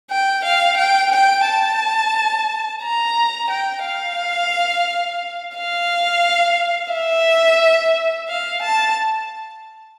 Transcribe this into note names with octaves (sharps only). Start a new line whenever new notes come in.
G5
F5
G5
G5
A5
A#5
G5
F5
F5
E5
F5
A5